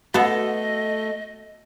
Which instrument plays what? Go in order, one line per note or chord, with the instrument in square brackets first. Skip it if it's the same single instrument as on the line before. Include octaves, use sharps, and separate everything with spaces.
[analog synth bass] A3 [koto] B3 A4 [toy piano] F#4 F#5 [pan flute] D#5